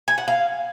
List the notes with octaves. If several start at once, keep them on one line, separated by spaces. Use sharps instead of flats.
G#5
F#5
F5